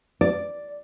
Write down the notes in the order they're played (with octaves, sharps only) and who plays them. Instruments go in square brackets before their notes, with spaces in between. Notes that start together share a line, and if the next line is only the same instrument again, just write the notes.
[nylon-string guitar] D5